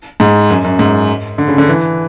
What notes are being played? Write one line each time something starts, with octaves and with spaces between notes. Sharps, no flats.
G#2
F#2
F#2
G#2
D3
C#3
D3
E3